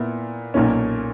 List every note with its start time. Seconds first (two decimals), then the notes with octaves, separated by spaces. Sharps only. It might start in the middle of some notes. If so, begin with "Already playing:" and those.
Already playing: A#2 B3 E4
0.54 B1 A#2 A#3 C#4